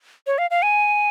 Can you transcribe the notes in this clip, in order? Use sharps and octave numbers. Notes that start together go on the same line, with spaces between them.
C#5
F5
F5
G#5